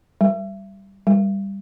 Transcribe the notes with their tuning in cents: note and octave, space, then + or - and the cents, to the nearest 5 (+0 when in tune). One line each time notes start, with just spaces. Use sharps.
G3 -5
G3 +10